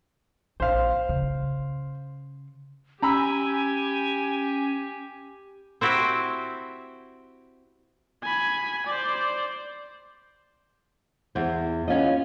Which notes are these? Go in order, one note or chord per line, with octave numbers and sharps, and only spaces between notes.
A#1 C5 F5
C#3
C#4 G4 G#5 A#5 B5 E6
C4 E4 F#4 G4
G#5 B5
C5 D5
E2 C5
B3 C#4 F4 D#5